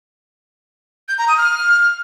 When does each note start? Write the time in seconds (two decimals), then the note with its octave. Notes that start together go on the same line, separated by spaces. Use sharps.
1.09 G6
1.18 A#5
1.28 D#6
1.38 F6